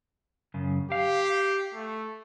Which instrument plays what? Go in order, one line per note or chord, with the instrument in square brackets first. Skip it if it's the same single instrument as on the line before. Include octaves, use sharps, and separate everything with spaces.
[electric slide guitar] F#2 C#3
[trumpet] G4 [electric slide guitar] F5
[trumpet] A3